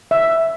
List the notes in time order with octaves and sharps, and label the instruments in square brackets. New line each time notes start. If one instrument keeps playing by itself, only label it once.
[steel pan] E5